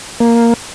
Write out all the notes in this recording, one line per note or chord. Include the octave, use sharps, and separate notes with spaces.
A#3